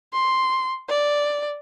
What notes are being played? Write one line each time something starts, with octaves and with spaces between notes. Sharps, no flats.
C6
D5